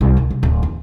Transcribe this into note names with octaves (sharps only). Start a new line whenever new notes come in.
C2
D2
C2
D1
E2